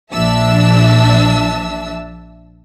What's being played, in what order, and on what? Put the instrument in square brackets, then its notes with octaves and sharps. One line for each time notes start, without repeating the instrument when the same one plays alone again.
[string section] A#1 F3 D4 E5 A5 E6